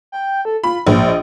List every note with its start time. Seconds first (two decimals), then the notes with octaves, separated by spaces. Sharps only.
0.12 G5
0.45 A4
0.63 F4 B5
0.87 A#1 G#2
1.06 D#5